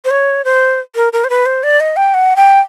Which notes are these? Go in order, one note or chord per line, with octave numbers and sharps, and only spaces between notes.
C5
C#5
C5
A#4
A#4
C5
B4
C5
D5
D#5
G5
F#5
G5